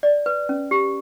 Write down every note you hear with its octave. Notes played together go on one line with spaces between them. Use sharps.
D5
B4
C#4
G4